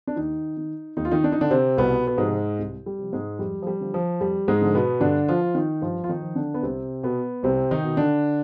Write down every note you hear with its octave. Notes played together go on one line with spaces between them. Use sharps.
D4
D#2 D#3 D#4
D#3
D#2 D#4
F4
D#3 D#4
D4
D#4
D3 D#3 D4
C3 C4
C2 B2 B3
B3
G#2 C3 F3 G#3
C2
G3
C3 F3
G#2 G#3
F2 G3
F3
G3
D3 F3
F3
F2 G3
G#2 G#3
D3 F3
B2 B3
G2 D3 D4
F3 F4
F3
D#3 D#4
G2 F3 F4
F4
D#3 D#4
F3
D3 D4
B3
C2 C3 C4
B2 B3
C2 C3 C4
D#3 D#4
B2
D3 D4